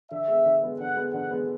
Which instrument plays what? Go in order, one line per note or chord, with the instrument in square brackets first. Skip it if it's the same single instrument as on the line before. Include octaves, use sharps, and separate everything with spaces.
[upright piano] D3 [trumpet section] E5
[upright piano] G#3 B3
D3
G#3 B3
[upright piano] D3 [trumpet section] F#5
[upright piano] G#3 B3
[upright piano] D3 [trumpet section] F#5
[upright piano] G#3 B3